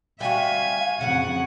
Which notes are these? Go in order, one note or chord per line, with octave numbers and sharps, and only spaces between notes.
G3 F#4 E5 F5 G#5
F2 C#3 F#3 F#5